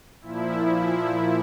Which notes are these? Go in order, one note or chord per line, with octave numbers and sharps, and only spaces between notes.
A#2 F3 E4